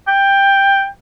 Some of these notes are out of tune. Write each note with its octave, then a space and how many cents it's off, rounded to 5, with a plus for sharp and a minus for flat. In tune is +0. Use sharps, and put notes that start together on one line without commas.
G5 +10